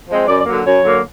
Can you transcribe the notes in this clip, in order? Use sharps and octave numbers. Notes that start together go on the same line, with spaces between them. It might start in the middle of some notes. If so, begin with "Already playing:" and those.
F3 G#3 C4
F#2 D5
D5
D3 F#3 A#3
F#2 C#5
D3 F#3 A#3